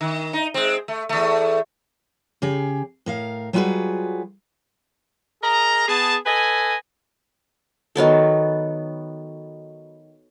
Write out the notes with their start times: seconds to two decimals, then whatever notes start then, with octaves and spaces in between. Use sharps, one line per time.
0.01 D#3
0.33 D#4
0.54 G#3 C4
0.88 A3
1.09 E2 A3
2.42 C#3 G4 G#4
3.06 A2 A#4 F5
3.53 F#3 G3 F4 F#4 G#4 B4
5.42 G#4 A#4 D#5 A#5
5.88 B3 G#4 A5
6.26 A4 B4 D#5 G#5
7.96 D#3 F#3 B3 A4